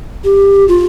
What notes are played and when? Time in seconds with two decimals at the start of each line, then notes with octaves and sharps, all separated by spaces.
0.24 G4
0.68 F4